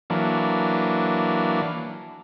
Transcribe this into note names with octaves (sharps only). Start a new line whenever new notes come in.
E3 F#3 A#3 D4